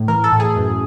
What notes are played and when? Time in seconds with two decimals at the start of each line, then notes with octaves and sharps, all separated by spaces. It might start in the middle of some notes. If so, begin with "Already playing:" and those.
Already playing: A2
0.08 E3 A#4
0.24 A4
0.32 A2
0.40 G#4
0.56 F#2